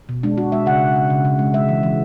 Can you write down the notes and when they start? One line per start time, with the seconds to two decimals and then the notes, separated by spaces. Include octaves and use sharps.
0.09 B2
0.23 G#3 D4
0.37 G#3 F#4
0.52 G#3 E5
0.66 C#3 F#5
0.81 C#3
0.96 C#3
1.10 C#3
1.25 C#3
1.39 G#3
1.54 G#3 E5
1.69 E3
1.83 E3